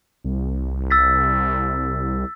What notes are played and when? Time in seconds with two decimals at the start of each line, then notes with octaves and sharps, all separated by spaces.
0.24 C2
0.90 E6 A6 B6